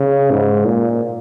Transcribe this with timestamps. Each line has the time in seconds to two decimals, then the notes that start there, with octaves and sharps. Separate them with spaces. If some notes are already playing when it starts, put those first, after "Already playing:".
Already playing: C#3
0.30 G#2
0.65 A#2